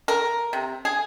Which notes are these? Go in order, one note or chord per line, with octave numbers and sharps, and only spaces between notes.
A#4
C3
G#4